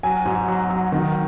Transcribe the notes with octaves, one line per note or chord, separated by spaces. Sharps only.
F#3 G#5
G#2
F#3
F#3
D#3